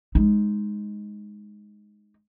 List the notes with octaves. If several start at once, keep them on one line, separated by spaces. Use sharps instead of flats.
G#3 D#4